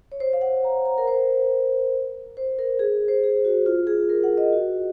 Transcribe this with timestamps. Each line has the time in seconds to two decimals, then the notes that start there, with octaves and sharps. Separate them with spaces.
0.12 C#5
0.20 C5
0.33 F5
0.41 F#5
0.64 A#5
0.85 A#5
0.98 A#4
1.07 C5
2.37 C5
2.59 A#4
2.79 G#4
3.08 C5
3.23 G#4
3.45 F#4
3.66 F4
3.87 G#4
4.09 A#4
4.24 F#5
4.38 D#5
4.52 F#4